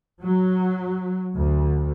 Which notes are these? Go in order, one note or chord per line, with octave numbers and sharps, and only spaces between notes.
F#3
D2